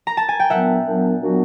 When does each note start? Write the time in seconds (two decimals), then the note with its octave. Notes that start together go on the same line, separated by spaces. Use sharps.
0.07 A#5
0.17 A5
0.29 G#5
0.40 G5
0.50 A#2 F#3 B3 D4 E5 F#5
0.86 A#2 F#3 B3 D4
1.22 A#2 F#3 B3 D4 F#4